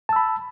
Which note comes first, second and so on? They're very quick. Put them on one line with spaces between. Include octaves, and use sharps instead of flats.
A5 E6 B5